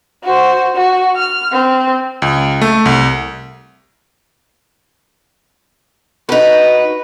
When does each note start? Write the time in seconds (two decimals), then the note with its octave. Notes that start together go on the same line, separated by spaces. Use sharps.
0.23 F#4 C5
0.75 F#4
1.16 F6
1.52 C4
2.22 C#2
2.62 A3
2.85 C2
6.29 D#4 F#4 B4